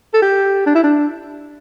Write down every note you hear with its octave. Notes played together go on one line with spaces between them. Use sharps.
A4
G4
D4
E4
D4